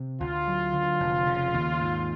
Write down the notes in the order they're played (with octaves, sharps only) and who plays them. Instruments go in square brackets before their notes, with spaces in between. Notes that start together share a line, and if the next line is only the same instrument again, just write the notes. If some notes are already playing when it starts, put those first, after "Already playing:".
Already playing: [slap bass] C3
[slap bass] D2 [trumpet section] F4
[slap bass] F#3
D3
F1
C#3
D#2
G#2